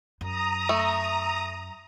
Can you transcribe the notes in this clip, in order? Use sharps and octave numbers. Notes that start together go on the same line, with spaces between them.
F#2 A#5 D#6
A3